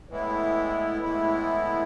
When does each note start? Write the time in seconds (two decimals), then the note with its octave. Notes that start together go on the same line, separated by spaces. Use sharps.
0.09 A2 E3 G#3 B3 E4
1.02 A2 E3 G#3 B3 E4